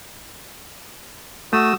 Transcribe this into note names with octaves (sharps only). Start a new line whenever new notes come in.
A3 F#4 D#6 E6